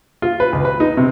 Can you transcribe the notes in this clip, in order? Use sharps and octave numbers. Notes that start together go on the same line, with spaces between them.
F4
B4
C#2
B4
D#4
C3